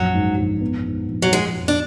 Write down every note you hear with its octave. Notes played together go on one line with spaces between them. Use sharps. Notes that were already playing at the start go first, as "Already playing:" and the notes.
Already playing: A#1 F#2 F#3
G#2
A#1
B3
G#2
A#1
F#3
F3 G#3
F2
D4